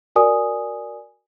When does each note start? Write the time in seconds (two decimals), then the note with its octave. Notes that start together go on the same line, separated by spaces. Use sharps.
0.16 F#4 A#4 D5 G#5 D#6